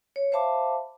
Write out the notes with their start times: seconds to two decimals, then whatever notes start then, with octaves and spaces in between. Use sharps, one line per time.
0.16 C#5
0.32 C5 E5 F5 A5 B5 D6